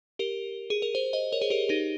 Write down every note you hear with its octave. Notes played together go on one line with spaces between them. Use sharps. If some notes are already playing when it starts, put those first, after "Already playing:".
G4 A#4
G#4
A#4
G#4 C5
C5 D#5
A#4 C#5
G#4 C5
G4 A#4
D#4 G4